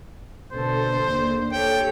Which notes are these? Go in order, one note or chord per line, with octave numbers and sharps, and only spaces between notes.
B2 D3 A4 C5
D#2 D3 A#3
G4 A4 C#5 G5